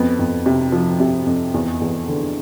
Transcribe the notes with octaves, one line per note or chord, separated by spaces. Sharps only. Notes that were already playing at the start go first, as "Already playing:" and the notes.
Already playing: F2 B3
F2
C3
F3
C3
F2
E2
E2
D3